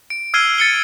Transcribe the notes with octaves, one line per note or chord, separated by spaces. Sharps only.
D7
E6 F6 G#6 C7 D#7 G7
A6 C#7 G7